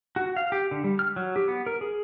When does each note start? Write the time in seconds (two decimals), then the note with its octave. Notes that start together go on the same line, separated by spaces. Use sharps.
0.16 F#4
0.37 F5
0.52 G4
0.71 D3
0.84 G3
0.99 F6
1.16 F#3
1.36 G4
1.48 B3
1.66 A#4
1.81 G#4